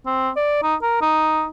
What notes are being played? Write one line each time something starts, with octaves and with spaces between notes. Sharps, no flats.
C4
D5
D#4
A#4
D#4